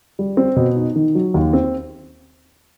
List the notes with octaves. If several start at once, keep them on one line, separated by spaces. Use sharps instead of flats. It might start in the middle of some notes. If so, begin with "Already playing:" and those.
G3
C4
B2
D#4
D#3
F#3
D#2
C4